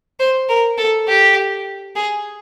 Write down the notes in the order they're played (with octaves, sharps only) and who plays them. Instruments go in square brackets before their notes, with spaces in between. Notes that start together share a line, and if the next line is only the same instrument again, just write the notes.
[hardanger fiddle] C5
A#4
A4
G4
G#4